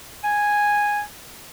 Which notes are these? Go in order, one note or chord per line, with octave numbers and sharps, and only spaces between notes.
G#5